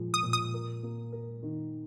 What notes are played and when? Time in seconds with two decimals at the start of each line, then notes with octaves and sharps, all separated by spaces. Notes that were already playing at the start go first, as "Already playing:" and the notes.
Already playing: A#2 F3 G#3
0.14 D#6
0.23 A#2
0.33 D#6
0.54 A#4
0.83 A#3
1.12 A#4
1.43 D#3